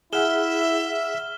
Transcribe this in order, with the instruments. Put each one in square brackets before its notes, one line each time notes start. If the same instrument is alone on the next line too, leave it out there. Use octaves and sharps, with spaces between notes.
[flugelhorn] E4 [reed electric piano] G#4 F#5 [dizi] E5 [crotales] F6 E7 G7